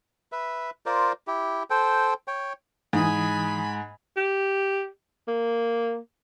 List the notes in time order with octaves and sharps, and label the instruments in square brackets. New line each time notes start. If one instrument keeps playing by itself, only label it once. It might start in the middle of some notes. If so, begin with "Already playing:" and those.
[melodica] B4 E5
F4 A#4 C5 D5
E4 G4
A4 C5 G5
C#5 G5
[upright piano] G#2 [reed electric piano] E3 D#6 [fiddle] G#5 B5
[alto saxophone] G4
A#3